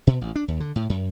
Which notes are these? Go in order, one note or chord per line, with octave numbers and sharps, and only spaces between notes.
B2
A1
D4
D#2
D3
A2
F#2